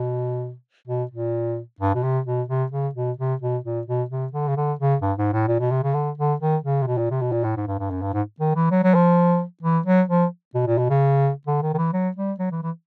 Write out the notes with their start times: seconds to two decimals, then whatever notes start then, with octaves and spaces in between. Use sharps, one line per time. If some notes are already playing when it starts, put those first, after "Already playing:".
Already playing: B2
0.88 B2
1.11 A#2
1.80 G2
1.95 B2
2.03 C3
2.26 B2
2.48 C3
2.72 C#3
2.95 B2
3.18 C3
3.41 B2
3.64 A#2
3.87 B2
4.10 C3
4.33 D3
4.48 C#3
4.57 D3
4.79 C#3
5.02 G2
5.18 G#2
5.33 A2
5.48 A#2
5.60 B2
5.71 C3
5.83 C#3
5.94 D3
6.18 D3
6.40 D#3
6.64 C#3
6.82 C3
6.87 B2
6.98 A#2
7.10 C3
7.21 B2
7.32 A#2
7.44 A2
7.56 G#2
7.67 G2
7.79 G2
7.90 F#2
8.02 G2
8.13 G#2
8.40 D#3
8.56 E3
8.71 F#3
8.84 F#3
8.94 F3
9.63 E3
9.86 F#3
10.09 F3
10.55 B2
10.67 A#2
10.78 B2
10.90 C#3
11.47 D3
11.62 D#3
11.74 D#3
11.78 E3
11.93 F#3
12.16 G3
12.39 F#3
12.51 E3
12.63 E3